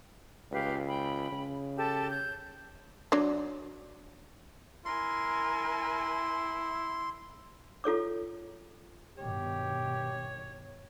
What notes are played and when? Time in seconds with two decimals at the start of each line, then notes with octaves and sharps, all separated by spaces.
0.52 C#2 G4 B4 F5
0.87 G5 B5
1.32 C#3
1.76 G4 A4 A5
2.09 C#5 G6
3.12 F#3 D4 D5
4.85 E4 A#4 G#5 C6
7.84 F4 A4 C#5 D6
9.18 G2 B2 D#3 G4 C#5